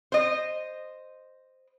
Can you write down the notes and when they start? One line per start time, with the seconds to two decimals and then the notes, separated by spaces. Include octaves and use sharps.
0.12 C5 D#5